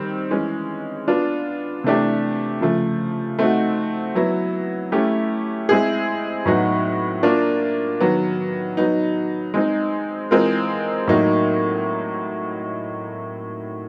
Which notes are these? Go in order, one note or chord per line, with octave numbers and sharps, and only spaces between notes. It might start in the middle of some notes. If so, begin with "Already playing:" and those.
Already playing: D#3 G3 C4
E3 G#3 C#4
B3 D4 F4
C3 E3 A3 D4 G4
C#3 F3 A3
A3 C4 D#4 F#4
F#3 B3 E4
A3 C#4 E4 G4
G#3 C4 E4 G#4
A2 F#3 B3 D#4 F#4
A#3 D4 F4
D#3 F#3 B3
F#3 B3 D#4
G#3 C4 D#4
E3 G#3 C4 F4 A#4
A2 F#3 A#3 D#4